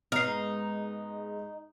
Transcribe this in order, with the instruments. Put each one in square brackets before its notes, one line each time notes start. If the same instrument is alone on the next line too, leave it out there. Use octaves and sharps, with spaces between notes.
[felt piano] G#2 B3 [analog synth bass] G#3 [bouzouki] D#4 [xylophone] F6 C7